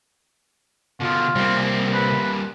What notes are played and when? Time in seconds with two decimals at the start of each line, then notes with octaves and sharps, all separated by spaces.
1.01 B2 D3 F4
1.36 C2 G3 A#3 C4
1.94 B4